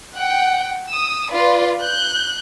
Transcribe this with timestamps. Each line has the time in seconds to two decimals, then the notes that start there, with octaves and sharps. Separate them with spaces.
0.16 F#5 G5
0.91 D#6 E6
1.31 F4 B4 D5
1.81 F#6 G6